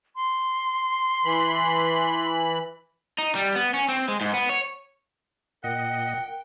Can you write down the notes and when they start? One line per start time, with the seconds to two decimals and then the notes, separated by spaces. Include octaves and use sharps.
0.16 C6
1.24 E3 B5
3.18 D#4
3.35 G3
3.55 B3
3.74 C#4
3.89 C4
4.08 G#3
4.21 G#2
4.34 B3
4.49 C#5
5.64 A#2 A#4 D#5 F#5 G5